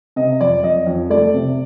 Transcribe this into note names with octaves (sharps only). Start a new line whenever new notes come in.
C3 D#5
F2 D5
F2 D#5
F2
A3 D5
C3